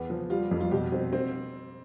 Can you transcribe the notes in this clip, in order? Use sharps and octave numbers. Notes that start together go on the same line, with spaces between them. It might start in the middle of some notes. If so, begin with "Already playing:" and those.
Already playing: E2 B3
F3
G3 F4
F2
F4
B2 G4
C4
C4